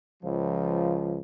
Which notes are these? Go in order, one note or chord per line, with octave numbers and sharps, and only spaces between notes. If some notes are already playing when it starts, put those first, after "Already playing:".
C#2 F3